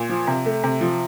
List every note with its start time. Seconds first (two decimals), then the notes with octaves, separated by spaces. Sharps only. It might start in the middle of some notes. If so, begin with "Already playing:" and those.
Already playing: A#2
0.09 F3
0.27 C3
0.46 A3
0.63 C3
0.81 F3